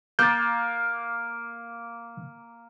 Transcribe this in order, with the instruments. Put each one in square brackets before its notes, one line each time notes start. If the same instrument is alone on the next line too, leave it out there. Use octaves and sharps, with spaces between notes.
[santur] A#3 [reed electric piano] G6 A6